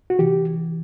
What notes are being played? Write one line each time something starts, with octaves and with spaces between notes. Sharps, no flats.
F#4
C3 E3 G4